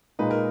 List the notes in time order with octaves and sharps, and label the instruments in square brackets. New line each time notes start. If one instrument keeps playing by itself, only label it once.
[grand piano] A#2 G#3 D#4 [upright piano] B4
[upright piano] A#4